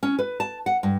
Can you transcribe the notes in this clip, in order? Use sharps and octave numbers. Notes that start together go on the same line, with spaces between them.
C#4
B4
A5
F#5
G2